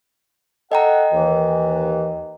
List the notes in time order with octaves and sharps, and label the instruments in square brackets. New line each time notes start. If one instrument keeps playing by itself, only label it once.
[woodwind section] A4 F#5 [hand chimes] D#5 G5 A#5
[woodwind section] D#2 E3